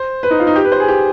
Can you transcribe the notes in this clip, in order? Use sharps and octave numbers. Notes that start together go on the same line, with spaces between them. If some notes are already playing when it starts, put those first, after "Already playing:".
Already playing: C5
B4
D#4
F4
D#4
G4
B4
C5
G#4
G4